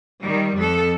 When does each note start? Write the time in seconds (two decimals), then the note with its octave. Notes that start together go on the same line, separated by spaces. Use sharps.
0.22 D#3 G3
0.57 F2 A4